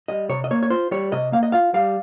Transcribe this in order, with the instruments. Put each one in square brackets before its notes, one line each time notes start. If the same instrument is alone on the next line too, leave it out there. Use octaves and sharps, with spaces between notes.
[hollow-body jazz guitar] G3 D#5
C3 C#5
D#5
A#3 C#5
C#5
F4 C5
G3 C#5
C3 D#5
A#3 F5
D#5
F4 F5
G3 F5